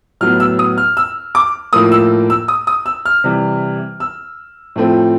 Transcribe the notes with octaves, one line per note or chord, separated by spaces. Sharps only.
A2 F#3 B3 F6
E6
D#6
F6
E6
D6
A2 F3 A#3 D#6
E6
E6
D#6
D#6
E6
F6
C3 E3 G3
E6
A2 F3 A3 C4